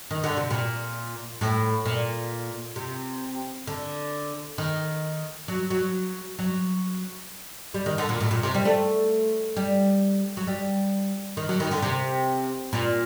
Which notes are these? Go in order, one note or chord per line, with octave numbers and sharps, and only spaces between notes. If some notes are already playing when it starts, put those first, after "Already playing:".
D#3
D3
C3
A#2
A2
A#2
C3
D3
D#3
F#3
F#3
F#3
G3
D#3
D3
A#2
A2
A#2
C3
G3
A3
G3
F#3
G3
D#3
F#3
D#3
D3
C3
A#2